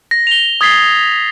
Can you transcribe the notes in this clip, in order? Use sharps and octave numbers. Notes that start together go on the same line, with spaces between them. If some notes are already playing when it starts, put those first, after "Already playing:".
A#6
F7 G7
D#6 G#6 A6 B6 C7 G7